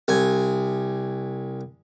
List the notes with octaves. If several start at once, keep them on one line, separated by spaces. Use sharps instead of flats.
C2 G#5